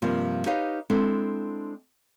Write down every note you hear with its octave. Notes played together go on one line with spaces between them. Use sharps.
G2 C3 F3 G3 A#3 F4
D#4 G4 B4 C#5 D#5 F5
G#3 C4 D4 E4 A4